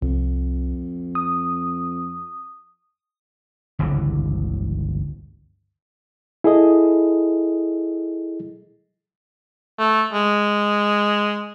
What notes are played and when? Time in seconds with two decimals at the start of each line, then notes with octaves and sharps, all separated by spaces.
0.02 C2 F2
1.15 D#6
3.79 G1 C#2 D3 E3
6.44 E4 G#4 A4 D#5
9.79 A3
10.13 G#3